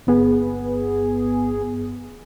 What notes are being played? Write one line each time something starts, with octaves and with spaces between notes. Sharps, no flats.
G1 B3 G#4